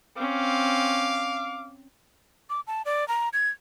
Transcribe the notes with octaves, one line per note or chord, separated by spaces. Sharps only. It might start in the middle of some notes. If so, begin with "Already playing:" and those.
C4 C#4 F5 D6
D6
A5
D5
A#5
G#6